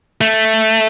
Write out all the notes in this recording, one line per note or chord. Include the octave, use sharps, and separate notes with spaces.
A3